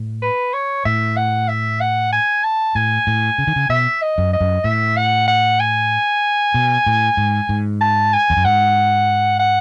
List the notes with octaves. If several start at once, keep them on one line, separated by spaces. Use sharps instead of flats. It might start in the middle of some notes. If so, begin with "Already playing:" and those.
Already playing: A2
B4
C#5
A2 E5
F#5
E5
F#5
G#5
A5
A2 G#5
A2
C#3
D#3
C#3
B2 E5
D#5
F#2
D#5
F#2
A2 E5
F#5
F#5
G#5
B2
A2
G#2
G#2
A5
G#5
E2
F#2
G#2 F#5
F#5